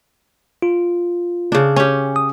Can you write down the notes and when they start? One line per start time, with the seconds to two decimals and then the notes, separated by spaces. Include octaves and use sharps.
0.62 F4
1.52 C#3 D4
1.76 C#4 G4 G#5
2.16 D#6